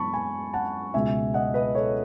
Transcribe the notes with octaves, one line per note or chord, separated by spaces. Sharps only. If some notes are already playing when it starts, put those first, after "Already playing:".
Already playing: F#2 E3 G#3 B3 A5 B5 C#6
G#5 B5
F#5 A5
C#2 B2 G#3 B3 E5 G#5
D#5 F#5
B4 D#5
A4 C#5